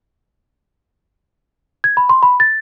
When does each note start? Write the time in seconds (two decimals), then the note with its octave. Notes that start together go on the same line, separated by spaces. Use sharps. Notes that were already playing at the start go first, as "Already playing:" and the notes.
1.84 G#6
1.97 B5
2.09 C6
2.23 B5
2.40 A6